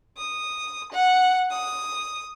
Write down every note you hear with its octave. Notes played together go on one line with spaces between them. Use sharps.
D#6
F#5
D#6